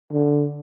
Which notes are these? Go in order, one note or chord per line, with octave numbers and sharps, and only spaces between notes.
D3